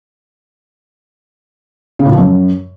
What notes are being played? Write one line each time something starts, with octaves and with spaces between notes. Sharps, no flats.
C#3
A2
F3
F#2